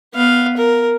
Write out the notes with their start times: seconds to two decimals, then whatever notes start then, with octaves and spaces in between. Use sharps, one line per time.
0.15 B3 F5
0.57 A#4